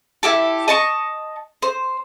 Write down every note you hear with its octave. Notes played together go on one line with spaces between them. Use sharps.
E4 F4 G4 A4
D#5 A5 C#6
C5